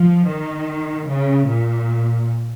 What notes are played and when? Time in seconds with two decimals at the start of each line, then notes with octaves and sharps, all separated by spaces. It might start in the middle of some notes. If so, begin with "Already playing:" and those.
Already playing: F3
0.26 D#3
1.07 C#3
1.48 A#2